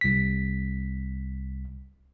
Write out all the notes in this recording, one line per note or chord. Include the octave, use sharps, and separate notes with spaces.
C2 B6